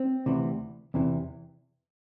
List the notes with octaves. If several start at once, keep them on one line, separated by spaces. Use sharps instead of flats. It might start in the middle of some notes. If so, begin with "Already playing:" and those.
Already playing: C4
D2 C3 E3
E2 C3 E3